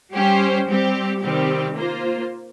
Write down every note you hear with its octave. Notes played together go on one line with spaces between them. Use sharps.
G3 C#4 G4 C5
G3 C4 G4
C3 D#3 G3 C4 G4
A#3 F4 C5